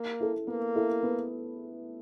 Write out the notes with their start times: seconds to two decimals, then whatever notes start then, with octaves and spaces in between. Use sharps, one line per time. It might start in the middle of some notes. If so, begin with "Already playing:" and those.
Already playing: A#3
0.20 E4 A4
0.48 A#3 B3
0.76 E4 A4
1.03 B3